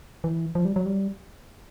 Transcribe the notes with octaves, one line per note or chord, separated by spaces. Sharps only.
E3
F3
G3
F#3
G3